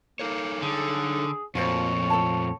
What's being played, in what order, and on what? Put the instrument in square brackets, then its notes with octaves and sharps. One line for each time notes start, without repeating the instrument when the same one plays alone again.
[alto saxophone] A#3 [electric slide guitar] D#4 A4 C#5
[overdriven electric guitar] D3 [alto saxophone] G#4
[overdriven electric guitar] F2 [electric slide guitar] A#2 A3 A#3 [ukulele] F4 F#4 C5 [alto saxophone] C#5
[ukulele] A4 F#5 A5